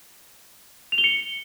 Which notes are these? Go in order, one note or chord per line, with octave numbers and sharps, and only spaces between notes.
F7
G7
C#7